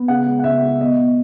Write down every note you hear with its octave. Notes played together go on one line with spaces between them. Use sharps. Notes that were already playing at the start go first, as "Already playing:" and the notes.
Already playing: B3
C#3 F#5
G#3
F#5
C#2 E5
G#3
B2 D#5
B2